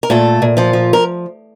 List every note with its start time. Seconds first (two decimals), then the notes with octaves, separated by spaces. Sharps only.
0.03 A#4
0.10 A#2 A3 A4
0.42 A#2
0.57 F3 F4
0.73 F3
0.93 A#4